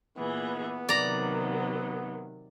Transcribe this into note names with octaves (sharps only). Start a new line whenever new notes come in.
A#2 E3 B3 G#4
C3 D#3 F#3 D5 A#5